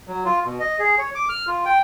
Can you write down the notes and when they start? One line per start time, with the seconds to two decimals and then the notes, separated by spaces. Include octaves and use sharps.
0.07 F#3
0.25 F4
0.45 B2
0.60 D#5
0.79 G#4
0.98 C#5
1.15 D6
1.29 F6
1.47 F4
1.65 G5